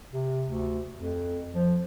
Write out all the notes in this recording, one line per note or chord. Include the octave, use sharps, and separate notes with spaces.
C3
D2
F2
F3